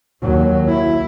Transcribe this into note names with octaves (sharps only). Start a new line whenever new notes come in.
D#2 F#3
E4